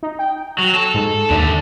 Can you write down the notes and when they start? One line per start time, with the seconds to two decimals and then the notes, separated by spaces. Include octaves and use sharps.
0.03 D#4
0.19 G5
0.59 F#3
0.75 A4
0.94 G#2
1.30 D#2 D3 D4 E5